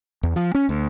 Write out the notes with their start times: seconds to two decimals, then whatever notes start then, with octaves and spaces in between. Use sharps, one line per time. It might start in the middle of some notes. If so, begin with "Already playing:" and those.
0.23 E2
0.36 F3
0.55 C#4
0.69 D2